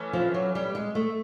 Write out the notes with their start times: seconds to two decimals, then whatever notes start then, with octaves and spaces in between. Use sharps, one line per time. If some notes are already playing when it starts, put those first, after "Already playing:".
Already playing: E3 A3 C#4 E4
0.13 F3
0.34 F#3
0.55 G3
0.75 G#3
0.95 A3